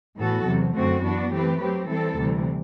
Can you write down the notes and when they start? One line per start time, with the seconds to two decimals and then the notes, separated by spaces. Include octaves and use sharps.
0.18 A2 E3 B3 F#4 A4
0.46 E2 C3 F#3
0.75 F#2 D3 A3 C4 F#4
1.03 E3 B3 D4 F#4
1.31 E3 A3 C4 G4 B4
1.60 F#3 C4 G4
1.89 E3 G3 C4 E4 A4
2.17 D2 C3 E3 G3